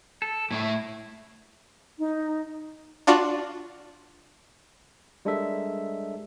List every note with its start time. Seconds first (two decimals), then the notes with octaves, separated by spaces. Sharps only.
0.22 A4
0.51 A2 A3 E4 E5
1.99 D#4
3.07 D4 F4 F#4 D5
5.25 G3 G#3 D4 A4 A#4 E5